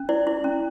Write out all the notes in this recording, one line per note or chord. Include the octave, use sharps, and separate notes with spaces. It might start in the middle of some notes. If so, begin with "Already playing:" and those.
Already playing: C#4
E4 D5
E4
C#4